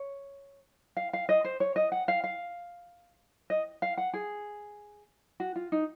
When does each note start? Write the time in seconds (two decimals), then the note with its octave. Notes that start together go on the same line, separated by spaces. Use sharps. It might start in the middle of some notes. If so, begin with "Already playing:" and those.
Already playing: C#5
0.97 F5
1.13 F5
1.29 D#5
1.45 C5
1.60 C#5
1.76 D#5
1.92 F#5
2.08 F5
2.24 F5
3.50 D#5
3.82 F5
3.97 F#5
4.13 G#4
5.40 F#4
5.56 F4
5.72 D#4